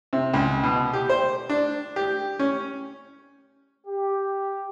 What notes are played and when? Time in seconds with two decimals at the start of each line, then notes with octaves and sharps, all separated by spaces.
0.13 C3
0.34 C#2
0.63 B2
0.93 G4
1.10 C5
1.49 D4
1.96 G4
2.39 C#4
3.87 G4